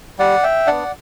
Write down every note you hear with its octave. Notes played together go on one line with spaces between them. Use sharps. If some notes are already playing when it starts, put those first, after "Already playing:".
G3 D5 F#5
E5 G5
B3 D4 D5 F#5